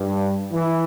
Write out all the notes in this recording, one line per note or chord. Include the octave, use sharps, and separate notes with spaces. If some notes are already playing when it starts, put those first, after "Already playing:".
Already playing: G2
E3